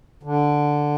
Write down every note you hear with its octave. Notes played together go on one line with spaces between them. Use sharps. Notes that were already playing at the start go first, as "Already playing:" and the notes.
D3